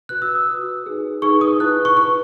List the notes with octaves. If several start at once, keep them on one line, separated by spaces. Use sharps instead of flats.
F#4 B4 F#6
E6
D#6
F#4 B4
D#4 G#4 B4
D#4 G#4 B4 C#6
D#6
E4 B4 F#6
C#6
E4 B4 C#6